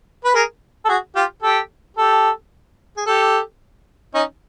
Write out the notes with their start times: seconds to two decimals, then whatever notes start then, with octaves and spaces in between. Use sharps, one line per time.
0.25 B4
0.35 G#4 A#4
0.85 A4
0.88 F#4 G#4
1.16 F4 G4
1.42 G4 A4
1.97 G4 A4
2.97 G#4
3.06 G4 A4
4.14 C#4 D#4